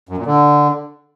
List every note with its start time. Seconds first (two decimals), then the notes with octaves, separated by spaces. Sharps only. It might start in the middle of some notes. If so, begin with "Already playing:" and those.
0.09 F#2
0.17 A#2
0.26 D3